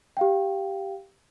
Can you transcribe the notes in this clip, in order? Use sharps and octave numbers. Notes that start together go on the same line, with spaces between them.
G4 F5 G5